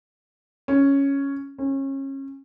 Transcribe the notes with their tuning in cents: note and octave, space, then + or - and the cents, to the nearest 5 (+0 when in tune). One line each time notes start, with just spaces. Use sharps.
C#4 +0
C#4 -30